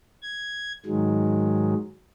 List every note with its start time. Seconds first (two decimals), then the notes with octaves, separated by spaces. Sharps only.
0.22 G#6
0.86 G#2 D#3 F#3 G#3